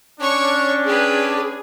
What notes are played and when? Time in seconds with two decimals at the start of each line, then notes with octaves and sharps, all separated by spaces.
0.19 C#4 D4 C#5 C#6
0.86 G4 G#4 B4